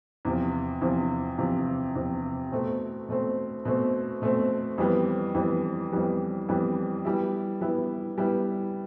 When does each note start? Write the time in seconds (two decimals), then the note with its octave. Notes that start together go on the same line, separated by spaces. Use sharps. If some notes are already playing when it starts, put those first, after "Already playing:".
0.25 E2 C3 F3
0.81 E2 C3 F3
1.38 E2 C3 F3
1.95 E2 C3 F3
2.52 B2 A3 C4
3.09 B2 A3 C4
3.65 B2 A3 C4
4.22 B2 A3 C4
4.78 F2 E3 G3 B3
5.34 F2 E3 G3 B3
5.92 F2 E3 G3 B3
6.49 F2 E3 G3 B3
7.05 G3 B3 E4
7.61 G3 B3 E4
8.18 G3 B3 E4